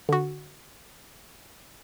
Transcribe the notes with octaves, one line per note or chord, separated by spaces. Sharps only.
D3 F#4